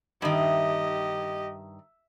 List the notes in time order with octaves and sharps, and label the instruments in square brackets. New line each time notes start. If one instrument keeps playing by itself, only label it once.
[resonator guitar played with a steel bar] G2 D#3 [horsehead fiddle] G4 D#5 [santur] E5